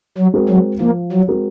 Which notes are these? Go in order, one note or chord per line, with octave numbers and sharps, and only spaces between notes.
F#3
G#3 C4 F#4 A#4
F#3
F3 A#3
F#3
G#3 C4 F#4 A#4